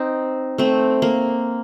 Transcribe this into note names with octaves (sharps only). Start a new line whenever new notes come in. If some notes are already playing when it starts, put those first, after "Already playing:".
Already playing: C4 D#4
A3 C4
A#3